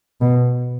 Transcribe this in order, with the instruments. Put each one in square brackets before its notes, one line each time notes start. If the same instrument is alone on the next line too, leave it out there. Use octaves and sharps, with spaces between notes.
[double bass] B2